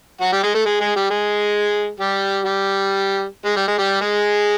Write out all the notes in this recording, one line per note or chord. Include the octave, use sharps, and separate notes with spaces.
F#3 F#4
G3 G4
G#3 G#4
A3 A4
G#3 G#4
G#3 G#4
G3 G4
G#3 G#4
G3 G4
G3 G4
G#3 G#4
G3 G4
G#3 G#4
G3 G4
G#3 G#4